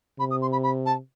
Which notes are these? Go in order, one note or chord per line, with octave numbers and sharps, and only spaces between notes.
C3 B5
D#6
C6
B5
B5
A5